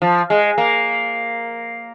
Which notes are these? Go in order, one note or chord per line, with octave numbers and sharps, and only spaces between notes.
F3
G#3
A#3